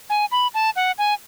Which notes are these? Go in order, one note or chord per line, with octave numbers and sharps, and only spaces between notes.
G#5
B5
A5
F#5
G#5